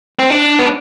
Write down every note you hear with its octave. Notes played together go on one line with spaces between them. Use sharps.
C4
D4
B3